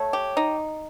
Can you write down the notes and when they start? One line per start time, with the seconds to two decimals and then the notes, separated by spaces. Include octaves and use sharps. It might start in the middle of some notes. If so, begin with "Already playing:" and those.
Already playing: A3 C#5
0.13 G4
0.37 D#4